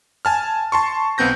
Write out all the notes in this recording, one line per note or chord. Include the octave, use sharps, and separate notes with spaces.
G#5 A5 F6
A5 C6 C#6
B1 B3 C4 G6 A#6